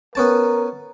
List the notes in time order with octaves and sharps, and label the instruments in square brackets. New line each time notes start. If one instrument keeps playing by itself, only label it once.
[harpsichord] B3 C#4 A5 [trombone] A#4